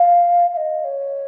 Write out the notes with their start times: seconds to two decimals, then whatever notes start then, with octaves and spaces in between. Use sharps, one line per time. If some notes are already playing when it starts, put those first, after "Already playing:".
Already playing: F5
0.53 F5
0.57 D#5
0.84 C#5